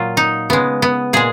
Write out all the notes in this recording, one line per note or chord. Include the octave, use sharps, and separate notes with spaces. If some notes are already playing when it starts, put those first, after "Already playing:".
Already playing: A#2 F#3 F4
D#4
C#3 G#3 B3
B3
A#2 G#3 G#4